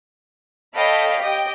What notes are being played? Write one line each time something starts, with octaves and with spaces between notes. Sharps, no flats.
A4 C#5 D#5 F5 G5 B5
G4 D#5 G5